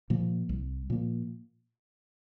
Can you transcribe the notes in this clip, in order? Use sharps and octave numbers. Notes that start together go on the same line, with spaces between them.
A#2 F3 A#3
C2
A#2 F3 A#3